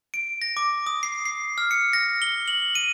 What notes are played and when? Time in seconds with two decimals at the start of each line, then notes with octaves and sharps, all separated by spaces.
0.14 D7
0.42 A#6
0.57 D6
0.86 D#6
1.03 C7
1.25 C7
1.58 F6
1.71 C#7
1.93 A#6
2.22 G7
2.48 F#7
2.75 D#7